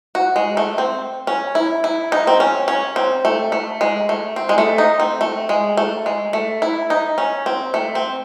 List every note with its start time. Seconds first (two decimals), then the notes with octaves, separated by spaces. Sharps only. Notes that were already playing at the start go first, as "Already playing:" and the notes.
0.15 F#4
0.36 G#3
0.57 A3
0.78 C4
1.27 C#4
1.55 E4
1.84 E4
2.12 D#4
2.27 C4
2.40 C#4
2.68 C#4
2.96 C4
3.25 A3
3.52 A3
3.81 G#3
4.09 A3
4.36 C4
4.49 G#3
4.58 A3
4.78 D#4
5.00 C4
5.21 A3
5.49 G#3
5.77 A3
6.06 G#3
6.33 A3
6.62 E4
6.90 D#4
7.18 C#4
7.46 C4
7.74 A3
7.95 C4